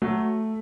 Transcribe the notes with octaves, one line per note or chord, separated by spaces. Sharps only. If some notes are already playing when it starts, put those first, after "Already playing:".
F#3 A3